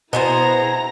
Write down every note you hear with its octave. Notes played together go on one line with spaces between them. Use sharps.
B2 B3 E4 G#4 C5 A#5